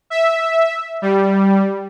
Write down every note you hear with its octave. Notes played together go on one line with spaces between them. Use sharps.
E5
G3